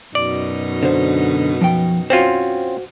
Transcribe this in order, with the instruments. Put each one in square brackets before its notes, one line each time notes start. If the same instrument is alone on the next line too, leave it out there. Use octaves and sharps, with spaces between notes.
[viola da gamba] F#2 B2 D#4 [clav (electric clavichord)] D5
[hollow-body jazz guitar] D3 C5
F3 G5
[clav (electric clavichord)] C4 C#4 F4 [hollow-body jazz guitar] F#4 C5